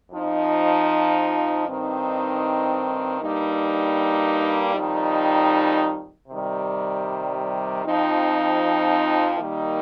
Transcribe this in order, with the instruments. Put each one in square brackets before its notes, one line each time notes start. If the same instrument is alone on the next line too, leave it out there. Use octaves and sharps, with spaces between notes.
[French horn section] F2 F3 D#4
G2 D#3 C4 D#4
G2 G3 A#3 D#4
F2 D#3 G3 D#4
C3 D#3 G3
F2 F3 C4 D#4
D#3 G3 A#3 D#4